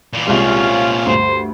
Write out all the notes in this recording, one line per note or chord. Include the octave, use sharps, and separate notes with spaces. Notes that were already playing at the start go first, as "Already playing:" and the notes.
A#2 E3
C2 A#2 G#3 C4 C#4 F4
D2 G2 C5